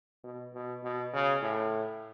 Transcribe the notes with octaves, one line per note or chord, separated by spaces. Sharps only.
B2
B2
B2
C#3
A2